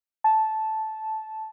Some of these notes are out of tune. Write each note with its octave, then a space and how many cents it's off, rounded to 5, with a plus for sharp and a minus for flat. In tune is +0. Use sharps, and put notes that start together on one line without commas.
A5 -10